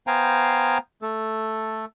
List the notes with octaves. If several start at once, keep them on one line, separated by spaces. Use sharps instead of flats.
B3 C5 F5 G5 G#5 A#5
A3 A4